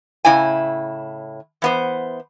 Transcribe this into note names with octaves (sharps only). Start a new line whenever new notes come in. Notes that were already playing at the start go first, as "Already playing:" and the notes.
A2 C#3 E4 G#5
E3 B3 C5